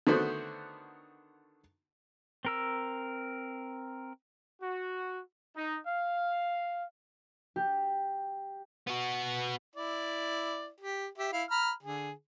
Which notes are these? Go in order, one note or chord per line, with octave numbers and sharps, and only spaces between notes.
D3 D#3 A3 B3 F#4 C5
C4 A#4 E6
F#4
D#4
F5
G4
B3 F#4
E4 D5
G4
G4 E5
E4 F5
A#5 B5 F6
D3 G#4